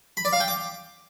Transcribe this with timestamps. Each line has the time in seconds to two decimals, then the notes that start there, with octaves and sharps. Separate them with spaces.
0.17 B5
0.25 D5
0.33 F5
0.40 G5
0.48 D6